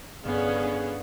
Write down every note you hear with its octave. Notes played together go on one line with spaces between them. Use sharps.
G1 B3 C#4 G#4 F5